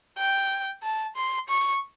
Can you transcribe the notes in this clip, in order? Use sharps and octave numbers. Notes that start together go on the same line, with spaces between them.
G5
A5
C6
C#6